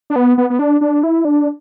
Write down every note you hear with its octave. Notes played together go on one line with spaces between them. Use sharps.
D4
B3
B3
B3
D4
D4
E4
D4